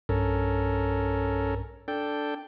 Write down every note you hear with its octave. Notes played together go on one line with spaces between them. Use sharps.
B1 G2 C#4 A4 A#4
D4 A4 G5